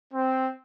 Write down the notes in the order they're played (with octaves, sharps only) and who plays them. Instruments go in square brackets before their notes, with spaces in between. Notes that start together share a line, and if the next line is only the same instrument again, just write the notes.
[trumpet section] C4